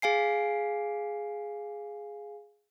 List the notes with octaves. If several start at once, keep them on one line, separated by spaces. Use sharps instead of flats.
G#4 F5 G#5 C7